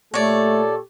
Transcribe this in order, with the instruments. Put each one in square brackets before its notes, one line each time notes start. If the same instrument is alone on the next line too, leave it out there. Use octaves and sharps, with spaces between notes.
[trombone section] A#2 G4 A4 [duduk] A3 [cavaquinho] C#5 D5